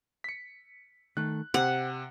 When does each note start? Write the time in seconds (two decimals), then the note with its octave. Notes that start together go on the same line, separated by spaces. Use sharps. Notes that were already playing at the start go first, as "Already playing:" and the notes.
0.24 B6 C#7
1.17 D#3 A3 A4 F#6
1.54 C3 G4 C5 F#5